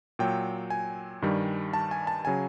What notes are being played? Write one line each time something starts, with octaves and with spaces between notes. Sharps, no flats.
A#2 F#3 G5
G#5
G2 D#3 G3
A5
G#5
A5
C#3 F#3 G#5